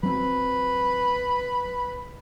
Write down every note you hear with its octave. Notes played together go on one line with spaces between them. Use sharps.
F#3 C4 B4